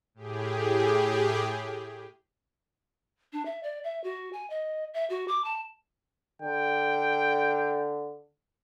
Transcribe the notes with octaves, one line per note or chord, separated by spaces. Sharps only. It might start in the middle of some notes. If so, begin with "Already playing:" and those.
A2 G4 G#4
D4
E5
D5
E5
F#4
G#5
D#5
E5
F#4
D6
A5
D3 G5